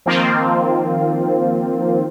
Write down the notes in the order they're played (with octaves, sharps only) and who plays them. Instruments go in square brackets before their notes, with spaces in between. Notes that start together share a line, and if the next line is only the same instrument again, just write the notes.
[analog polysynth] D#3 F3 A#3 C4 F4